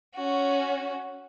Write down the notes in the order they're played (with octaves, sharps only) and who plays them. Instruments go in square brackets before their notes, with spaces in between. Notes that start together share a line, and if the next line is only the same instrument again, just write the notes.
[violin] C#4 F#4